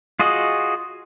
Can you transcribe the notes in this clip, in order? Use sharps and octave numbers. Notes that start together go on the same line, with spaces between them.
F4 F#4 G#4 D#5